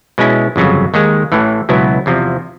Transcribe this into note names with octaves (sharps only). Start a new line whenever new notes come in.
B2 G#3 C#4 E4
G1 F2 C#3 F#3
D#2 D#3 G#3
A1 A2 E3
C#2 B2 F#3 B3 E4
E2 C3 F3